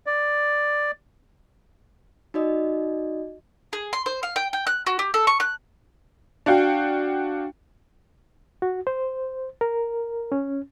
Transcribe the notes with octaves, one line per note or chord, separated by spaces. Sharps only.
D5
D#4 F#4 D5 D#5
G#4
C6
C5
F5
G5
G5
F#6
F#4
G4
A4
C#6
F#6
D4 F#4 F5 G5
F#4
C5
A#4
C#4